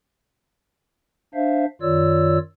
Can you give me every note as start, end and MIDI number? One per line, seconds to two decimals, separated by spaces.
1.34 1.65 62
1.34 1.65 72
1.34 1.65 76
1.34 1.65 77
1.81 2.38 42
1.81 2.38 51
1.81 2.38 65
1.81 2.38 73
1.81 2.38 74
1.81 2.38 88